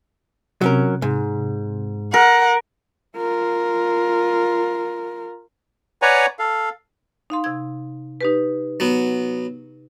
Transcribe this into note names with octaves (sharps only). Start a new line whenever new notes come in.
C3 F#3 C#4 A#4
G#2
A#4 F#5
F4 A#4
B4 C#5 D5 F#5 G#5 A#5
A4 F5
D#4 F5 C6
C3 G#6
D#4 G4 B4
F#3 B3